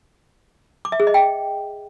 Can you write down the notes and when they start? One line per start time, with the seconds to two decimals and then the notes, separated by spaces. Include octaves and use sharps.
0.85 D6
0.92 E5
1.00 G#4
1.07 D#5
1.14 G5